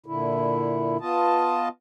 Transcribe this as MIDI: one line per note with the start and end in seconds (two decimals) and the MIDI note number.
0.06 0.97 46
0.06 0.97 50
0.06 0.97 64
1.01 1.69 59
1.01 1.69 65
1.01 1.69 75
1.01 1.69 81